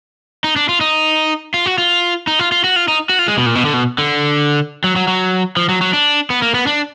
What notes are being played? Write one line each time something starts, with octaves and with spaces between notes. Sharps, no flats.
D#4
D4
F4
D#4
F4
F#4
F4
D#4
F4
F4
F#4
F4
D#4
F#4
F4
G#3
B2
A#2
B2
D3
B2
D3
F#3
F#3
F#3
F3
F#3
F#3
D4
B3
A#3
B3
D4